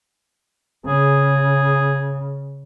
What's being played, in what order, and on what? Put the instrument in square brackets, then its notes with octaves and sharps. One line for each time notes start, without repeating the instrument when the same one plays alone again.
[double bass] C#3 [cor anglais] G#4